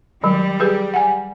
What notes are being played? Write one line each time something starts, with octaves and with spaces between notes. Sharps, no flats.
D#3 F#3 G3
G4 G#4 B4
F#5 G#5